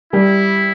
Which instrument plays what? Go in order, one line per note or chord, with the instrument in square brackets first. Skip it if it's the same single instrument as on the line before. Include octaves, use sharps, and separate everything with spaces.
[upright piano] G3 [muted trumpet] E4